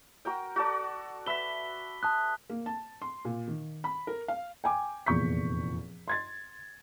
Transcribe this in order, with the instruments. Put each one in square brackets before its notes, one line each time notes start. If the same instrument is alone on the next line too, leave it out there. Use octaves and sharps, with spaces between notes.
[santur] F#4 A#4 G5
F#4 A4 D5
[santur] B4 E5 [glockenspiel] B6 G7
[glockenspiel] A5 D#6 F#6
[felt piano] A#3
A5
C6
A#2
D#3
B5
A#4
F5
G5 G#5 D6
F1 E2 A#2 C#6 G6 B6
C6 G#6 A6